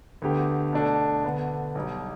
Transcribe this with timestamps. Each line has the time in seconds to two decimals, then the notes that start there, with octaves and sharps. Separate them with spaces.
0.22 D2 D3 B3 G4
0.73 B2 A3 D4 A4
1.24 D2 D3 B3
1.75 B1 B2 G3